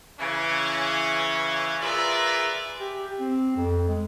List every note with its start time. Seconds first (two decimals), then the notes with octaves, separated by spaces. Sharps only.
0.19 C#3 E3 C#4
1.80 F4 G#4 A#4 B4 D5 E5
2.80 G4
3.19 C4
3.56 F2
3.88 G#3